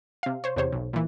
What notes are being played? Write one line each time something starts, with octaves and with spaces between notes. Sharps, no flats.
C3 F5
C5 C#5
E2 C3 C5 C#5
B1
A#2 E3